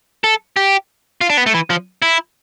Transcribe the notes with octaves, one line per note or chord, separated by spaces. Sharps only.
A4
G4
F4
D4
B3
A3
E3
F3
E4